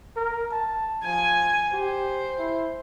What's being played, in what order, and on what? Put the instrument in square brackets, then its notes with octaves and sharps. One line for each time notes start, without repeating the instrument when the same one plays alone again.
[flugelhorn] A#4
A5
[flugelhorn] F3 [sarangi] G#5
[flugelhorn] G4 [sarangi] C5
[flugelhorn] E4